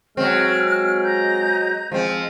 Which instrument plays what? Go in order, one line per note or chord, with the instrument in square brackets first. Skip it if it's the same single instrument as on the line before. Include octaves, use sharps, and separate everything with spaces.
[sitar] F#3 C4 [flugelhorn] G#3 [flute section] F6
[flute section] D#5 A#5 G6
[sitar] F3 C4 [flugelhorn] G#3